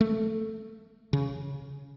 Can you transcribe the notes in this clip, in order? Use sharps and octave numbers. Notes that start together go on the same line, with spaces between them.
A3
C#3